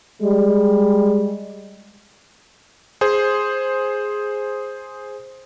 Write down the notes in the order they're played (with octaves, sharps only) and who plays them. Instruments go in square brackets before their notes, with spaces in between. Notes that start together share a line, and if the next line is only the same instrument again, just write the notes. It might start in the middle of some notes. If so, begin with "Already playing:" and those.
[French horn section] G3 G#3
[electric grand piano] G#4 C5